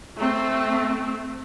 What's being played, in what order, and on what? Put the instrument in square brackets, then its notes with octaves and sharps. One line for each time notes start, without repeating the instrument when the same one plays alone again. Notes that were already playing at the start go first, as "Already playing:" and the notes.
[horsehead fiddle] A3 C4